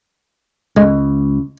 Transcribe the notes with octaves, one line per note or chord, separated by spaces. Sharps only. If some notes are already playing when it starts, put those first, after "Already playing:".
C#2 G#3